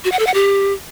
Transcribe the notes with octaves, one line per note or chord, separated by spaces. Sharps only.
F#4
F#5
A4
F#5
G4